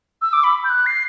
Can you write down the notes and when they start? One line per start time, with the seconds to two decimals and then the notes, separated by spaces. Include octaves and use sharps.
0.22 E6
0.33 D6
0.44 B5
0.65 G6
0.70 F#6
0.86 C7